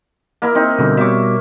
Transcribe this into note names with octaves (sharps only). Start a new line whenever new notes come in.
A#3 E4 A#4
C4 D#4
B2 D3 G3
B2 G3 C#5 E5 D6